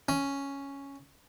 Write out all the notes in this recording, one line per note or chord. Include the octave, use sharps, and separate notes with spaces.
C#4